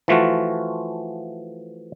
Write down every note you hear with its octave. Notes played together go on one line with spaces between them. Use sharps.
E3 F3 A3 F4 F#4